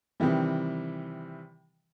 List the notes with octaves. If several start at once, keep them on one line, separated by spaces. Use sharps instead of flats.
C3 D#3 E3 G3